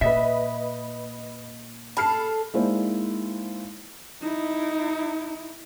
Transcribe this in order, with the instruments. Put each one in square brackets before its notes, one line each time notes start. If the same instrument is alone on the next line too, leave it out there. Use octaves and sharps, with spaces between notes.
[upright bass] A#2 [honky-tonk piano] B4 D#5 B6 [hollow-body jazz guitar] E5
[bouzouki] A4 [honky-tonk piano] B5 F6 C7
[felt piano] G#3 A#3 D#4 E4 C5 D5
[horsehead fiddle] D#4 E4